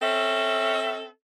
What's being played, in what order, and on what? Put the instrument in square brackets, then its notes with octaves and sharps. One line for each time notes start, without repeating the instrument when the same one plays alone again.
[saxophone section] C4 C#4 A4 E5